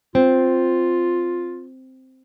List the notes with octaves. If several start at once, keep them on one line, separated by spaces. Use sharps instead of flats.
C4 F4